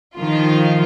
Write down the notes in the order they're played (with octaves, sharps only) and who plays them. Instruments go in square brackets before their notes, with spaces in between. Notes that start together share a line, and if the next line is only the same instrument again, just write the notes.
[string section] D#3 F3 F4